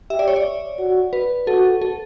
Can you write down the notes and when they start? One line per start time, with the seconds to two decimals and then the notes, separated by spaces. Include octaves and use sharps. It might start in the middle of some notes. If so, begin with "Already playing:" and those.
0.10 G4 E5
0.19 D5
0.28 C#5
0.36 D5
0.79 F#4
1.13 B4
1.47 F#4 A4
1.82 A4